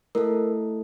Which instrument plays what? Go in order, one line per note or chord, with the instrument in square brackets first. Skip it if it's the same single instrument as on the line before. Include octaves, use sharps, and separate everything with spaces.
[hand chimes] A3 E4 A4 A#4